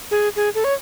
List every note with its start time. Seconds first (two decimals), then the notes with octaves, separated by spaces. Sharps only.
0.11 G#4
0.36 G#4
0.55 A4
0.64 C#5